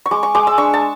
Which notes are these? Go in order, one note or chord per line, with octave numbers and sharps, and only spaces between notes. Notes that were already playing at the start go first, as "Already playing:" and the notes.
C#6
G#3 D6
C#6
G#3 D6
E6
D4 C#6
A5